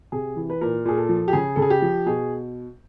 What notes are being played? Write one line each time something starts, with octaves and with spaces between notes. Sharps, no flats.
C3 G#4
E3
B4
A#2 A#4
A#2 G#4
A4
F3
G4
C#3 G#4
C#3 A4
G#4
G4
F3
B2 G#4